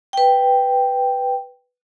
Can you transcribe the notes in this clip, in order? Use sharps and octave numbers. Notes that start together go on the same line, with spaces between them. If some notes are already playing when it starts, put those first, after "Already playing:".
B4 G5